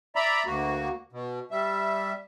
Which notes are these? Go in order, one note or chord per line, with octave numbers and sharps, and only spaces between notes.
D5 E5 A#5 B5
D2 A#3 F#4
B2
G3 E5